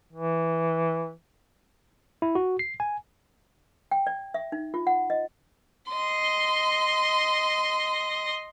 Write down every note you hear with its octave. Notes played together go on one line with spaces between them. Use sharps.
E3
E4
F#4
C7
G#5
G5
D5
E5
D#4
F4
F#5
D#5
D#5 C6